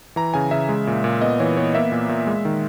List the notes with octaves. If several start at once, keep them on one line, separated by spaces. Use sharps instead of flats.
E3 A#5
C#3 G#5
C#3 E5
G#3
A#2
A#2
B3 D#5
E3 C#5
B3 C#5
A#3 E5
A#2
A#2
G#3
D#3